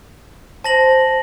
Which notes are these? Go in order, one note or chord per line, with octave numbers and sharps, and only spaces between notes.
C5 A5 A#6 F#7